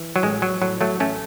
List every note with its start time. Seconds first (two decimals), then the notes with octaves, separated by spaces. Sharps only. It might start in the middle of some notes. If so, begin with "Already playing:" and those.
Already playing: E3
0.16 F#3
0.23 A1 G#3
0.42 F#3
0.62 A2 F#3
0.81 F#3 A3
1.00 A1 A3 C#4